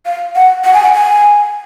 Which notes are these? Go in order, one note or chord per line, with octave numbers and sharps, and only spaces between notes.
F5
F#5
F#5
G#5
F#5
G#5